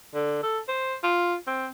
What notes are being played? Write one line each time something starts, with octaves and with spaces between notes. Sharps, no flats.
D3
A4
C5
F4
C4